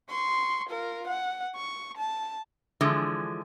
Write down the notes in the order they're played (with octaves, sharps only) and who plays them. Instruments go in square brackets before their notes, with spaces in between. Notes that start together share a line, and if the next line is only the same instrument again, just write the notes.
[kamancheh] C6 C#6
F4 A#4
F#5
C#6
A5
[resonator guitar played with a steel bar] D3 E3 F3 G#3